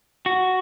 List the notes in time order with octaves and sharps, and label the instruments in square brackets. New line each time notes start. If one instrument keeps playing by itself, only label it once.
[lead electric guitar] F#4